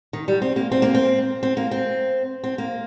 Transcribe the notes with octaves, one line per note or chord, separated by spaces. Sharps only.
D#3
G3
C4
A#3
C4
A#3
C4
C4
A#3
C4
C4
A#3